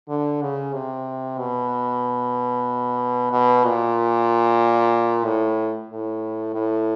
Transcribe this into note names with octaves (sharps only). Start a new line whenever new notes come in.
D3
C#3
C3
B2
B2
A#2
A2
A2
A2